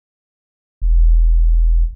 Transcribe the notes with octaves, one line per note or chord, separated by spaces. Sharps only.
E1